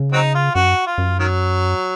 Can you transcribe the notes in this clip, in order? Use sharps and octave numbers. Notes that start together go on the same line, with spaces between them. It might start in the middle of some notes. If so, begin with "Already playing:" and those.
Already playing: C#3
F#3 C4 D#4
F4
F#2 F#4
F4
F#2
D#3 F#3